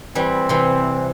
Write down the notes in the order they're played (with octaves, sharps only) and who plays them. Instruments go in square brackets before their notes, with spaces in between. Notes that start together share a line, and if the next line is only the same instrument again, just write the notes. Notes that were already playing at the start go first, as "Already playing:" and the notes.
[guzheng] E3 G3 [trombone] C4
[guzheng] C3 E3